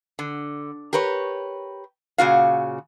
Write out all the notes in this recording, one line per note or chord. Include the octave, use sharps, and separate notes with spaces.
D3
G4 A#4 B4 C#5
A#2 C#3 F#4 F5